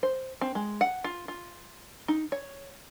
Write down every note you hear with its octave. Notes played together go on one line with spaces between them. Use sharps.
C5
C4
G#3
F#5
F4
F4
D#4
C#5